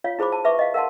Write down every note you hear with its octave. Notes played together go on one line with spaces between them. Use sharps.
F4 C#5 F5
E4 G#4 C5 B5 D6
A5
B4 E5 C#6 D6
D#5 F5
A#4 F5 F#5 A5 C6